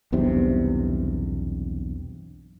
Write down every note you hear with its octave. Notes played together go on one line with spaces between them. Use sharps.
B1 E2 G2 C3